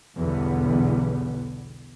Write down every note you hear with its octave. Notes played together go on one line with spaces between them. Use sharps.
B1 E2 D3 G3 B3